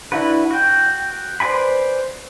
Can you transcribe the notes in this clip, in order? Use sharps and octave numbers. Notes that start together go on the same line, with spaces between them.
D4 E4 F#4 B4
F#4 G5
B4 C5 D5 G#5 B5